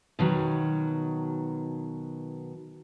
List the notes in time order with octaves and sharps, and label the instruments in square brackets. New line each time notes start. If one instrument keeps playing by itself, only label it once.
[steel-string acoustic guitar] B2 D#3 F#3